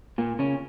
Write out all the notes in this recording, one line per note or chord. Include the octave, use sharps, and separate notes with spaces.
A#2 A#3
C#3 C#4